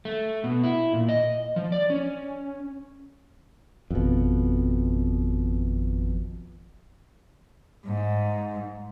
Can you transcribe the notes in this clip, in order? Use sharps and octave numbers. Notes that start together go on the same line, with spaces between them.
A3
B2
E4
A#2
D#5
F3
D5
C#4
G#1 F2 B2
G#2